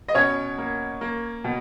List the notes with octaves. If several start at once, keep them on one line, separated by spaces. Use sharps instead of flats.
D#5
B2 C#4 C#5
A#3
A#3
B2